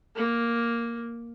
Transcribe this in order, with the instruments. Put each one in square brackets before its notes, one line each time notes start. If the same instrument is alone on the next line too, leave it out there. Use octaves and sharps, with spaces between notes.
[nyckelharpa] A#3